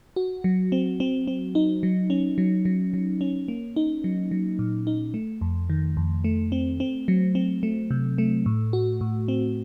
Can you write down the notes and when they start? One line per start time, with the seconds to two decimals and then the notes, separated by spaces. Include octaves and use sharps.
0.16 F#4
0.44 F#3
0.72 C4
1.00 C4
1.28 C4
1.55 D#4
1.83 F#3
2.10 C#4
2.38 F#3
2.65 F#3
2.94 F#3
3.21 C#4
3.48 A#3
3.76 D#4
4.04 F#3
4.31 F#3
4.59 A#2
4.87 D#4
5.14 A3
5.41 F2
5.70 D#3
5.97 F2
6.24 A3
6.52 C4
6.80 C4
7.08 F#3
7.35 C4
7.63 A3
7.91 C3
8.18 A3
8.46 A2
8.73 F#4
9.01 A2
9.28 C4